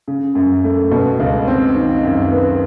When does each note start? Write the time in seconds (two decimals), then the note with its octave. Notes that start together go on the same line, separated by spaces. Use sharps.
0.08 C#3
0.35 F#2
0.64 A3
0.91 B2
1.20 C#2
1.47 C4
1.75 D#3
2.04 F#2
2.31 B3